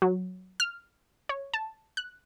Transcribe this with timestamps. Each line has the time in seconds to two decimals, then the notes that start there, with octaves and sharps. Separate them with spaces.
0.02 F#3
0.60 F6
1.29 C#5
1.54 A5
1.97 F#6